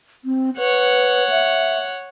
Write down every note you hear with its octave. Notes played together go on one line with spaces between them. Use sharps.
C4
B4 C#5 F#5
E5